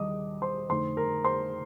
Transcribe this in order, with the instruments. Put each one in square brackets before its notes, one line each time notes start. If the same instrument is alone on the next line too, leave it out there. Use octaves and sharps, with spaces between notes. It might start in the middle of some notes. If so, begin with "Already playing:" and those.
Already playing: [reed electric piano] D#2 D#3 G3 [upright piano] D#5 D6 D#6
[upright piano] C5 C6
[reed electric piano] F2 D3 A3 D#4 [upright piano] C5 C6
[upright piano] A#4 A#5
C5 C6